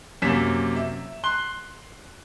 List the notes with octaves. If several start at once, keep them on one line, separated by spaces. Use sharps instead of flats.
F#2 C3 A#3 C#4 B6 E7
E5
C6 F#6 G7